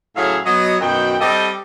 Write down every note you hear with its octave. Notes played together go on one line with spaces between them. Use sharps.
A2 C#3 F#3 G#4 E5 F5
F#3 B3 F#4 D#5
F#2 B2 D#3 F#5 G5
G3 C4 G4 A4 D#5